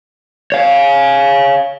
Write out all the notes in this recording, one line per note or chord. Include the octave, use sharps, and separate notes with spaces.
C#5 F5